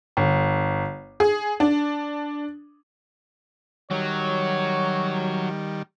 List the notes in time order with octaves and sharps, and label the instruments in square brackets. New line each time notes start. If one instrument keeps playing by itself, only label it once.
[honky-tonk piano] G1
G#4
D4
[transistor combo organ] D#3 G3 [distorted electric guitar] F#3 [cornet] C#5